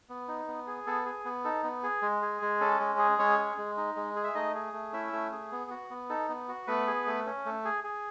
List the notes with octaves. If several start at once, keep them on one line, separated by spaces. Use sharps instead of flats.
B3
D#4
B3
G#4
B3 A4
G#4
B3
D#4 A4
B3
G#4
G#3
G#4
G#3
C#4 A4
G#3
G#4
G#3 C#4 C#5
G#4
G#3
D#4
G#3
G#4
E5
A3 D#4 D#5
G#4
A3
C#4 E4 E5
A3
G#4
B3
F#4
B3
D#4 A4
B3
F#4
A3 B3 B4
G#4
A3
C#4
A3
G#4
G#4